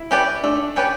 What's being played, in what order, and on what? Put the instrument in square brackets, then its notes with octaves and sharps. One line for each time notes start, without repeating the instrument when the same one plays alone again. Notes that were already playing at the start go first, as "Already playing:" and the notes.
Already playing: [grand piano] E4
[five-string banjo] C#4 G4 B4 D5
[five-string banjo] A3 [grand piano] D4
[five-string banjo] C#4 G4 B4 D5